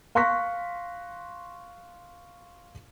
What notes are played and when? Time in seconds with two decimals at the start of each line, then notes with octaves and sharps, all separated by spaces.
0.15 F5 C6 C#6 F#6 A#6 B6